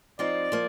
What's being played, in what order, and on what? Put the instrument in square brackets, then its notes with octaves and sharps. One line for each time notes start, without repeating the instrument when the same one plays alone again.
[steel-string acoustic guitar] F3 C4 D#4 [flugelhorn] D5
[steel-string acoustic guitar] F3 A#3